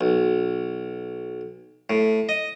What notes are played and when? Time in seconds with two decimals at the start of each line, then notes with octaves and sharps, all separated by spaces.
0.01 B1
1.90 A2
2.29 D#5